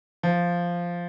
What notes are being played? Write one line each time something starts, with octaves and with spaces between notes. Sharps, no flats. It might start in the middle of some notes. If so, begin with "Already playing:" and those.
F3